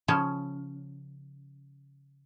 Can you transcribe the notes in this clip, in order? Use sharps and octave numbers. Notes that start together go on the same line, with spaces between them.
C#3 F3 C#4